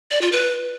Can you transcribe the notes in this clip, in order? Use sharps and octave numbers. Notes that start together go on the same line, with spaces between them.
D5
F4
B4